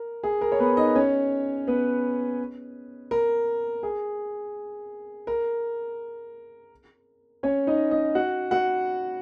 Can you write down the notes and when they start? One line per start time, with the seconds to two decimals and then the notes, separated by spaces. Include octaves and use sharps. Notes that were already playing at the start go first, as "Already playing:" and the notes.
Already playing: A#4
0.24 G#4
0.41 A#4
0.52 C#5
0.59 B3 B4
0.77 D#4 D#5
0.95 C#4 C#5
1.67 B3 B4
3.11 A#4
3.83 G#4
5.27 A#4
7.43 C#4 C#5
7.67 D#4 D#5
7.91 D#4 D#5
8.15 F#4 F#5
8.51 F#4 F#5